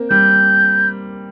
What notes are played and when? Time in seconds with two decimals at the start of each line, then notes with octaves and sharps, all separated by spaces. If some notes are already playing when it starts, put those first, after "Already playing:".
Already playing: A#3 C4
0.10 G3 G6